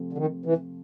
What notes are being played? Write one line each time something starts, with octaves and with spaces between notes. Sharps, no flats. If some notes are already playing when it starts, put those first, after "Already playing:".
Already playing: C3 F3 A3 C4
D3
D#3
E3